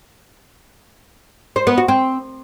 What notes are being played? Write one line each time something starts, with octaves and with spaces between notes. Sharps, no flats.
C5
B3
F#4
C4